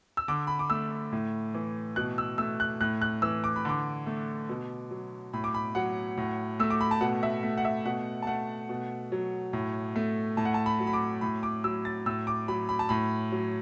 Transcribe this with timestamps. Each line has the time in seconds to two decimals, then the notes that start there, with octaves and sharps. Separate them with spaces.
0.17 E6
0.28 D3 D6
0.47 B5
0.59 D6
0.70 A3 E6
1.12 A2
1.55 E3
1.96 B2 F#6
2.18 E6
2.38 A3 E6
2.60 F#6
2.81 A2 F#6
3.01 F#6
3.22 E3 E6
3.44 D6
3.56 B5
3.65 D3 D6
4.06 A3
4.49 B2
4.91 F#3
5.33 A2 B5
5.44 D6
5.54 B5
5.75 F#3 F#5
6.17 A2
6.60 A3 E6
6.70 D6
6.81 B5
6.91 A5
7.01 B2 F#5
7.23 E5
7.43 A3
7.58 F#5
7.65 E5
7.85 B2 F#5
8.22 A5
8.27 A3 F#5
8.69 B2
9.12 F#3
9.53 A2
9.96 A3
10.37 A2 A5
10.45 F#5
10.54 A5
10.66 B5
10.80 F#3
10.87 B5
10.93 D6
11.21 A2 B5
11.43 D6
11.64 F#3 E6
11.85 A6
12.06 A2 E6
12.27 D6
12.48 F#3 B5
12.69 B5
12.79 A5
12.89 A2 B5
13.32 F#3